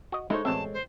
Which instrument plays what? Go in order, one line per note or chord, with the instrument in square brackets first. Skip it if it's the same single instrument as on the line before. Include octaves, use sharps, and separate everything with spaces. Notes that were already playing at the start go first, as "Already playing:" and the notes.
[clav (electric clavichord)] F#4 D#5
[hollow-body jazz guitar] G#3 A4 C#5 [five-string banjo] D#4 [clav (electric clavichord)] E4 C5
[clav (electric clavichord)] A1 B2 E5 [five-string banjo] C4 [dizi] A5
[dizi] C5